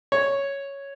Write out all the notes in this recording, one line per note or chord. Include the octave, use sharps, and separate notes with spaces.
C#5